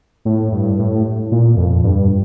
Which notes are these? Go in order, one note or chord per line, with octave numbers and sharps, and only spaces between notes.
A2
G2
A2
A#2
F2
G2